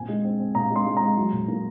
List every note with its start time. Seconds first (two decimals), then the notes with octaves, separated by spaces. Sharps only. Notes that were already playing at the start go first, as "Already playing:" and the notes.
Already playing: A#2 C4 G#5
0.08 G#3
0.25 C4
0.39 C4
0.55 A#2 A#5
0.70 G#3
0.76 C6
0.86 G#3
0.97 G#3 A#5
1.17 F#3
1.32 A#2
1.48 A#3